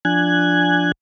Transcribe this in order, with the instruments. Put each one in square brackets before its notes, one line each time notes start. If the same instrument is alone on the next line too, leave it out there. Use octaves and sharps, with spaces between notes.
[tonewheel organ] F3 D4 G#5 F#6 G#6